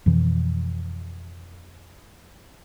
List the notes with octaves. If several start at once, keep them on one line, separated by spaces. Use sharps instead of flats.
F2 B2 E3 F3